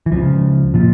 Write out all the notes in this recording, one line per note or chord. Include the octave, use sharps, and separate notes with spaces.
E3
C#2 C#3 F3
A#2 F3